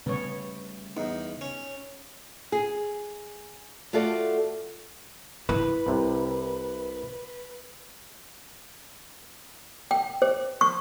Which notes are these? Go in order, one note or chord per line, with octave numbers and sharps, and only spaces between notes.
C#3 G3 A3 B3 C#5
E2 D#4
C#4
G#4
A3 F4 F#4 A4 D5
E4 B4
C2 C3
G5
C5
C#6